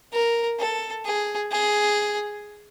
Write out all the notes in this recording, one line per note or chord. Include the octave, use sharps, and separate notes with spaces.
A#4
A4
G#4
G#4